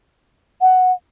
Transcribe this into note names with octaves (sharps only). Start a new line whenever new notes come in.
F#5